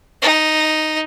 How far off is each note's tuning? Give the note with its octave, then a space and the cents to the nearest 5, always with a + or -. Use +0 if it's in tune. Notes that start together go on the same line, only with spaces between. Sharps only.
D#4 +0